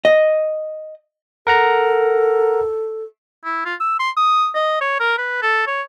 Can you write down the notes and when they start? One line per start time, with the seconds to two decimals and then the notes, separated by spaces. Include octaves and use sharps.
0.05 D#5
1.47 A4 A#4 F#5 A#5
3.44 E4
3.65 F4
3.80 E6
3.99 C6
4.17 D#6
4.55 D#5
4.81 C#5
5.00 A#4
5.18 B4
5.42 A4
5.67 C#5